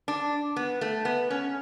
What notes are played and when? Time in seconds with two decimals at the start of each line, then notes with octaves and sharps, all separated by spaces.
0.08 D4
0.56 B3
0.81 A3
1.05 B3
1.30 C#4